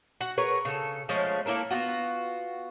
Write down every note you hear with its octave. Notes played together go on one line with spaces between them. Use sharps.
F#4 F#5
G#4 A#4 B4 C#5
C#3 A4
F3 G#3 A3 C#4
A#3 E4 A4 A#4
B3 F4 F#4